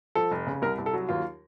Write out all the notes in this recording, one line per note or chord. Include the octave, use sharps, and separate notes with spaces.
F3 A4
F1
C#3
C2 A#4
C2
A4
F#3
D#2 F4